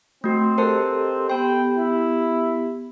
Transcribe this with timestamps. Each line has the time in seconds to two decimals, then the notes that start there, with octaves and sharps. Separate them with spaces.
0.24 A3 C4 F#4
0.58 G4 A4 A#4 C5 D#5 A5
1.30 B3 G4 G5 C6
1.76 E4